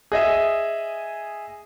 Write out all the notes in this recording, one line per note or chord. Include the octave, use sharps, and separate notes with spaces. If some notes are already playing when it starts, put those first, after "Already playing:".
G#4 D#5 E5